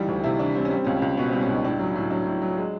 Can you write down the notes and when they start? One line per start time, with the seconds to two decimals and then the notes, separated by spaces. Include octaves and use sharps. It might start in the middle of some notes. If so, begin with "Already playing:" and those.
Already playing: C#2 E3 G3 D#4
0.08 D2
0.24 C3 E4
0.39 E3 D4
0.55 G3 C4
0.65 C#4
0.71 G3 C4
0.84 C#2 C#4
0.95 C4
1.02 C#2
1.17 B2 B3
1.29 G3 C4
1.41 C#4
1.49 C#2 D#4
1.64 A2 D4
1.79 F#3
1.95 A2
2.11 F#3 D4
2.27 A2
2.42 F#3
2.57 G#3